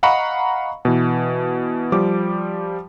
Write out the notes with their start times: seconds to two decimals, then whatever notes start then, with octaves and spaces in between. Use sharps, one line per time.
0.03 D#5 F5 F#5 A#5 B5 C#6
0.85 B2 E3
1.92 F3 G3 D6